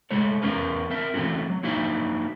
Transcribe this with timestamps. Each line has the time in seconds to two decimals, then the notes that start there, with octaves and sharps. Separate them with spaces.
0.11 G#3 A3 A4 C#5
0.42 E2 C#4 A#4 B4
0.90 C4 A#4 E5
1.14 E3 A3 C4 C#4 F#4
1.50 F#3
1.63 F#3 A#3 D#4 F#4 E5